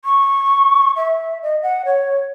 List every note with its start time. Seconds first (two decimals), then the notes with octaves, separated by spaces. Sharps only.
0.05 C#6
0.97 E5
1.43 D#5
1.63 F#5
1.86 C#5